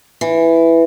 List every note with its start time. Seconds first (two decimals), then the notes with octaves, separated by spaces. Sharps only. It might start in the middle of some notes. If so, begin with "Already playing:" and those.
0.21 E3